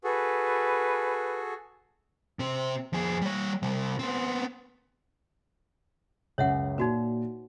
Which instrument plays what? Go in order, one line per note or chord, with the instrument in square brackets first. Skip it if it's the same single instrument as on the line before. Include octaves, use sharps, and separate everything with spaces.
[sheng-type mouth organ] F#4 G#4 A4 [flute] B4
[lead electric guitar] C3 C4
F2 G#4
G3 C#5
C3 G3
B3 C4
[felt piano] C#2 F#2 [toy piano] C#5 E5 F#5
[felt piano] A#2 [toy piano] D#4 F#4 B4